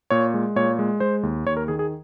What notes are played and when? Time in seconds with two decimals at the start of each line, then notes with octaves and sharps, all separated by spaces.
0.10 A#2 C#5
0.34 G#3
0.56 A#2 C#5
0.79 G#3
1.00 G#3 C5
1.23 D#2
1.46 D#2 C#5
1.57 A#4
1.68 D#3 G#4
1.79 G#4